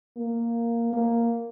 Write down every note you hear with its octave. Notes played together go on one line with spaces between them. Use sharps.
A#3
A#3